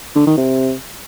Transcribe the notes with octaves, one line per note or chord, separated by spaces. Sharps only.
D3
D#3
C3